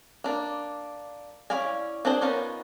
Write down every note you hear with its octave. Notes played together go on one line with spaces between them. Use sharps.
A#3 D4
C#4 E4 D5 F5 G#5
C4 D4 G#4 C5
B3 C#4 D#4 F4 A#4